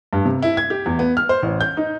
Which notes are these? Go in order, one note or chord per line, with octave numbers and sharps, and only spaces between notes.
G2
C3
E4
G#6
G4
E2
B3
F6
C5
A1
G6
D#4